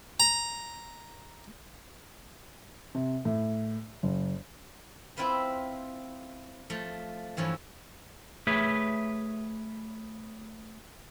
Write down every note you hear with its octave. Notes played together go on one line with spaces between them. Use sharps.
A#5
C3
A2
F#1
C4 E4 F4 B4 C5
F3 A3
G2 E3 F3 C#5
A3 G#4 B4 C#5 E5